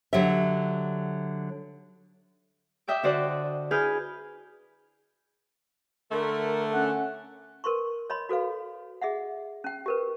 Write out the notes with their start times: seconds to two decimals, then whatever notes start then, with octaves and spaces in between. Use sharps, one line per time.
0.13 D3 F#3 G4 E5
2.88 D#5 E5 G5 D6
3.03 D3 F#4 C5 D5 D#5
3.71 E4 G#4 B4 D#6 F6 G6
6.12 D3 A3 A#4
6.72 C#4 F#5 F#6
7.64 A#4 B4 C6 C#6
8.10 C#5 D#5 B5 C6
8.29 F#4 A4 B4 F5
9.02 G#4 D#5 E5 F#5
9.64 C#4 G5
9.86 G4 A#4 B4